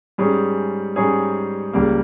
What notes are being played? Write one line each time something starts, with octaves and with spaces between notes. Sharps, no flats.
G#2 G3 C#4 G#4
G#2 G3 C#4 G#4
C#2 C#3 G3 A#3